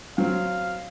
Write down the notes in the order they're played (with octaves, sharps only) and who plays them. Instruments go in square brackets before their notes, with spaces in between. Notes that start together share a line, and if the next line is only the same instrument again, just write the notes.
[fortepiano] F#3 C4 [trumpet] F5